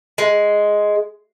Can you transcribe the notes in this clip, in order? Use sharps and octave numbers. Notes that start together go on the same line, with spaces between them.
G#3